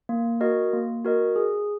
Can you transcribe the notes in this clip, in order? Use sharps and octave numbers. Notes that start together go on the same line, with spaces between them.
A#3
F#4 A#4 D#5
A#3
F#4 A#4 D#5
G#4